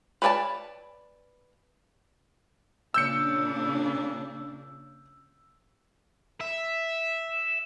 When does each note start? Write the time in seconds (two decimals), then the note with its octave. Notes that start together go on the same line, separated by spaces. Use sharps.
0.22 B4 C#5 D5 G#5 A5
2.94 A#2 C#3 D4 E6 G6 C#7
6.40 E5